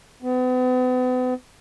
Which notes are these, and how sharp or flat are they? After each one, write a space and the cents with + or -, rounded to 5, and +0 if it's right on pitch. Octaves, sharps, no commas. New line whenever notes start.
B3 +40